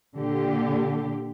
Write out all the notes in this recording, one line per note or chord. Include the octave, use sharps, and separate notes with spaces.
A#2 D3 G4